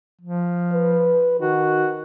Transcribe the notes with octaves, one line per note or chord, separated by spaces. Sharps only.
F3
B4
D#3 F#4